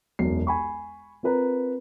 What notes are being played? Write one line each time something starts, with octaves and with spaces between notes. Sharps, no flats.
E1 B1 F#2 C7
G#5 B5 C#6
C4 F4 A#4 B4 A#5